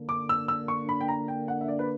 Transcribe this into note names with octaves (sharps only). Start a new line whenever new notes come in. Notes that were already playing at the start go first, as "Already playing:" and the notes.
Already playing: D3 A#3 D4
D6
E6
E6
C#6
B5
G5
A#5
G5
F#5
E5
D5
B4